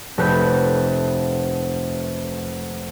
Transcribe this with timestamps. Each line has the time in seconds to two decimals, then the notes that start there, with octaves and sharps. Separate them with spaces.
0.18 F1 A4 B4 G6